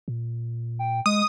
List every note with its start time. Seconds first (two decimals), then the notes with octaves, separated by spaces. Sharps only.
0.08 A#2
0.79 G5
1.06 G#3 D#6